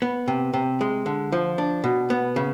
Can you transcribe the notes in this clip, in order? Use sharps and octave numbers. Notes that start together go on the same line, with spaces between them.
B3
C3
C3
G#3
D3
F3
D4
B2
B3
C#3